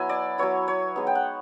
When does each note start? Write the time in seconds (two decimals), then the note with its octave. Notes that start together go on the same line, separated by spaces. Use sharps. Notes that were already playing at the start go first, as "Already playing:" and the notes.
Already playing: F#3 B3 E4 G#5
0.09 D5
0.38 F#3 B3 E4 C#5
0.68 C#5
0.96 G#3 B3 D#4
1.07 G5
1.15 F#5